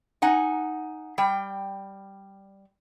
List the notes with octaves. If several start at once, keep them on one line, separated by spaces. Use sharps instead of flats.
D#4 F#5 G#5
G3 G5